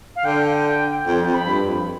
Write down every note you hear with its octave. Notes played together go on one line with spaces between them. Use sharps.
F5
D3 G5
G5
F2 G5
F2
B5
G2
F2